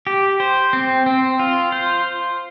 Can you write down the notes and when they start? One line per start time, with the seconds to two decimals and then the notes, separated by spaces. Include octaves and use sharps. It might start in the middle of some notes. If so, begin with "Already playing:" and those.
0.07 G4
0.40 C5
0.73 C4
1.06 C4
1.39 F4
1.72 C5